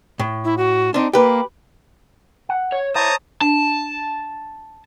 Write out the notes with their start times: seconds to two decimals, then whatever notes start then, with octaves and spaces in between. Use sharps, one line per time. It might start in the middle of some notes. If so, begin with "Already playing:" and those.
0.19 A2
0.44 E4
0.57 F#4
0.94 C4 D4 D#4
1.13 A#3 G4 B4
2.49 F#5
2.72 C#5
2.95 E4 C5 C#5 A5 A#5 D#6
3.41 D4 A5